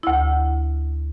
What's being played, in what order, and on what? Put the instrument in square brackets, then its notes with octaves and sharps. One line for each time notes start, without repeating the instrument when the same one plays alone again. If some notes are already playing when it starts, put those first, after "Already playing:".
[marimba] D2 E4